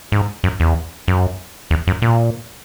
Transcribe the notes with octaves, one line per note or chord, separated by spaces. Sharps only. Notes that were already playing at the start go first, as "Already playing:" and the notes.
G#2
F#2
E2
F#2
E2
F#2
A#2